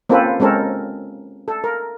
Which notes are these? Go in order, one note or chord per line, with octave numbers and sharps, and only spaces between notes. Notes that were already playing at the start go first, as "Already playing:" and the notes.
A#3 C4 C#4 F4 A4 B4
G#3 C4 C#4 A4 A#4
A4
A#4